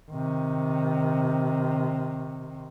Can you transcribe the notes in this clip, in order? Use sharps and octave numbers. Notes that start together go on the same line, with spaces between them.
C3 D#3